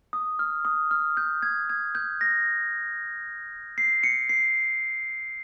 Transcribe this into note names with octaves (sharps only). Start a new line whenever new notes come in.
D#6
F6
D#6
F6
G6
G#6
G#6
G6
A#6
C7
C#7
C7